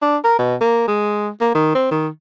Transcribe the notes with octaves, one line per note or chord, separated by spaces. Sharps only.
D4
A#4
B2
A#3
G#3
A#3
D#3
C4
D#3